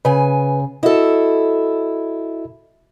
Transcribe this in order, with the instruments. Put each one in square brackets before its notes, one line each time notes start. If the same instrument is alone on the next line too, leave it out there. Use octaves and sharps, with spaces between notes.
[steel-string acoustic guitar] C#3 G#5 [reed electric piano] B4
[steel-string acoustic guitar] E4 A4 [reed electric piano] F#4 D#5